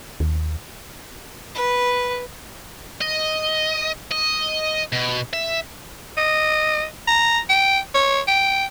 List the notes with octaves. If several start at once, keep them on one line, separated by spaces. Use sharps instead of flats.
D#2
B4
D#5
D#5
B2
E5
D#5
A#5
G5
C#5
G5